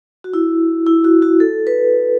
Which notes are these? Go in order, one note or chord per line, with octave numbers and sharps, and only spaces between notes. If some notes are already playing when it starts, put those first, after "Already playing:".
F#4
E4
E4
F#4
F#4
A4
B4